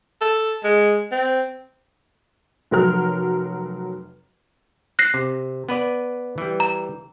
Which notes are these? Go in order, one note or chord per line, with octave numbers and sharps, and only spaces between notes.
A4
G#3
C4
F1 F#3 A#4 F6
F#6 A#6 C7
C3
B3 B4 D5
E3 G3
A#5